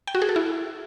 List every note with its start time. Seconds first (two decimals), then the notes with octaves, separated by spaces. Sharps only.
0.07 G5
0.15 F#4
0.22 G#4
0.29 A4
0.36 E4